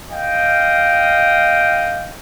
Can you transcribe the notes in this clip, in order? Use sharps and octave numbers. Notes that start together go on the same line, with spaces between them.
D#5 F5 G5